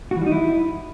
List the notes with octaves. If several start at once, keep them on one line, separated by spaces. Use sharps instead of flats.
F#4
E3
G3
D#4
E4